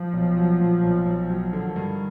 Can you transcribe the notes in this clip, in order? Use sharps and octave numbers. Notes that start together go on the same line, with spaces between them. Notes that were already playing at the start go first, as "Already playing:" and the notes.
Already playing: F3
B1
F#3
A#2
B1
B1
F#3
D3 D#3
G2